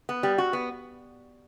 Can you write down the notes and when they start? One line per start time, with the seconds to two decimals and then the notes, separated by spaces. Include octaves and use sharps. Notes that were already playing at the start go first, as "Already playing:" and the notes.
0.09 B3
0.23 G3
0.38 F#4
0.53 B3